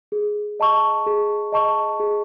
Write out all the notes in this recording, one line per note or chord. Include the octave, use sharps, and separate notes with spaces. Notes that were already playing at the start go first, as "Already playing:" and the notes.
G#4
D#5 A5 C#6
G#4
D#5 A5 C#6
G#4